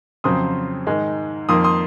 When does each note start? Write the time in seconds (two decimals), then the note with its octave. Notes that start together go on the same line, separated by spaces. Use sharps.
0.24 F2 C#3 F#3 C4 C6 D#6
0.87 G#2 D#3 G#3
1.49 F2 D#3 A#3 C6 D#6
1.64 C6 D#6